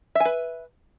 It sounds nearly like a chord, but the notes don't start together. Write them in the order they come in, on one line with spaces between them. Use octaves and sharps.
E5 G#5 B4